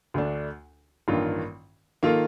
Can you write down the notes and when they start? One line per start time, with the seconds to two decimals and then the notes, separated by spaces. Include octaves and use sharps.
0.14 D2 D3 A3 D4
1.08 A1 G2 D#3 A#3 F4
2.03 D#3 A#3 F4 A4